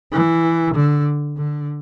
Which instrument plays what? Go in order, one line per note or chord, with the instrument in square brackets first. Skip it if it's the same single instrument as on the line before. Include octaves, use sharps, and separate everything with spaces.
[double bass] E3
D3
D3